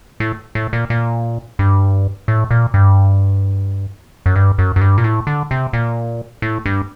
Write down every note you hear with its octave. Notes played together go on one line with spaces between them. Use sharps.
A2
A2
A#2
A#2
G2
A2
A#2
G2
F#2
G2
F#2
F#2
G2
A#2
A2
D3
C3
A#2
A2
G2